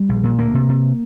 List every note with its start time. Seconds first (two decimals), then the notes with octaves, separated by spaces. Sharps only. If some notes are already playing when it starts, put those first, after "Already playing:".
Already playing: G3
0.09 A#1
0.23 A#2
0.39 D2 A#3
0.54 C3
0.69 C3